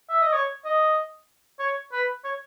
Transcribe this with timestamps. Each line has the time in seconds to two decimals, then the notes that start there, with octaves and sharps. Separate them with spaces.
0.09 E5
0.22 D#5
0.33 C#5
0.65 D#5
1.60 C#5
1.92 B4
2.24 C#5